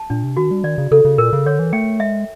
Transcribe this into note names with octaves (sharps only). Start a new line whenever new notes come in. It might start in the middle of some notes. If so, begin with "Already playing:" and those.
Already playing: A5
A#2 D4
C3
D#3 F#4
G3
D#3 D5
C#3
C#3 A4
C#3
A#2 A#4
C#3
D3 C#5
E3
A3 G5
G#3 E5